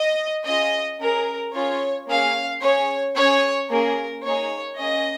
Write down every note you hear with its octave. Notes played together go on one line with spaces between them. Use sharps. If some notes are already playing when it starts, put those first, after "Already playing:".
Already playing: D#5
C#4 F4 G#4 D#5
C#4 G#4 A#4
C#4 F4 G#4 C#5
A#3 C#4 G#4 F5
C#4 G#4 C#5
C#4 G#4 C#5
A#3 C#4 G#4 A#4
A#3 D#4 G#4 C#5
A#3 C#4 G#4 D#5